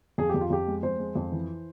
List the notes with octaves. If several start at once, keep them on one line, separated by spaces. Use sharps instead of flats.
F2 G#4
G4
F2
F4
F2 G4
G#3
F2 C5
G#3
F2
E3